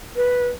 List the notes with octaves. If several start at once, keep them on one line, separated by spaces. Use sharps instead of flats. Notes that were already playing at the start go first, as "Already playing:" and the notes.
B4